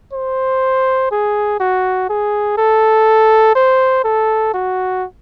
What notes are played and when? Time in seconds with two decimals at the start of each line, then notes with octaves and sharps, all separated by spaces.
0.13 C5
1.12 G#4
1.60 F#4
2.10 G#4
2.58 A4
3.55 C5
4.04 A4
4.54 F#4